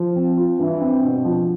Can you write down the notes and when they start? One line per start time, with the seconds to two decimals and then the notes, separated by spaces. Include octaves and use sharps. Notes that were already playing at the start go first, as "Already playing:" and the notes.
Already playing: F3
0.16 C4
0.37 F4
0.59 G2 E3
0.81 C4
1.02 G2 B2
1.25 F3